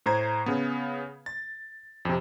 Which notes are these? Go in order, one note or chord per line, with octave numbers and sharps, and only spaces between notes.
A2 C5 A#5 G#6
C#3 B3
A6
F2 C3